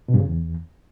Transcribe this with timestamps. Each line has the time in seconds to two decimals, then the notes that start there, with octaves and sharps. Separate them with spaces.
0.08 B2
0.14 G2
0.20 C#3
0.25 E2